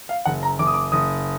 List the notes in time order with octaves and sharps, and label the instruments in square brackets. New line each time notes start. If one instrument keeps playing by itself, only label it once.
[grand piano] F5
F#1 F#5
A#5
F#1 D6
D#6
D6
F#1 D#6